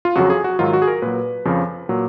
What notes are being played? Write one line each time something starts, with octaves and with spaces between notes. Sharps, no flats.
F4
F2 C#3 F#3 F#4
G#4
F#4
G#2 D#3 F#3 F4
F#4
G#4
A#4
A#2 F#3 B4
F2 C#3 F3
A#2 F#3